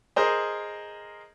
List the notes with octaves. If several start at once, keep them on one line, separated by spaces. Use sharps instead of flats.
G#4 A#4 C5 D#5